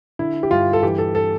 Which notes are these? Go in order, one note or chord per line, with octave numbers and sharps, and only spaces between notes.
D3 E4
G4
G2 F4
A4
E3 G4
A4
A4